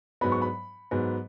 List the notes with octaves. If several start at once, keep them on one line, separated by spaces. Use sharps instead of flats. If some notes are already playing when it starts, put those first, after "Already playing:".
G#2 F#3 B3 B5
C#6
B5
G#2 F#3 B3